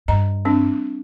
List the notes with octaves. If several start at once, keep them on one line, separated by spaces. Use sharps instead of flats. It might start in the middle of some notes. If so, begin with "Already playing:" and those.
G2 D#5 A#5
G3 C4 D4